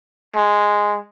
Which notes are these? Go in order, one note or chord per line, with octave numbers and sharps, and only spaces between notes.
G#3